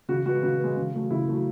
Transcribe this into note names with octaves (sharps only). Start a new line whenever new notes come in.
C#3 F#4
G#3 B3 F#4
C#3 F#4
G#3 B3
C#3
F#3 A3
C#3 E4
F#3 A3